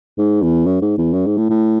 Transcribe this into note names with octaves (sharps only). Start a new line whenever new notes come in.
G#2
E2
F#2
G#2
E2
F#2
G#2
A2
A2